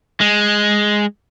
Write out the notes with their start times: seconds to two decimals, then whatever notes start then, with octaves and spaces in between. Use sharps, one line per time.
0.21 G#3